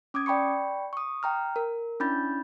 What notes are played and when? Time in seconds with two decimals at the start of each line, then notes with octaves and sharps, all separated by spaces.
0.14 C#4 D6 D#6 G#6
0.26 D5 G5 B5 C#6 C#7
0.93 C#6 D#6
1.23 G5 A#5 F6
1.56 A#4
2.00 C#4 D4 E4 B5 G6 A6